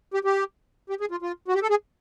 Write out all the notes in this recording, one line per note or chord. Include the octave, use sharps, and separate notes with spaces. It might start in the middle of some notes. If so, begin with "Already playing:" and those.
G4
G4
G4
G#4
F4
F4
F#4
G4
A4
G#4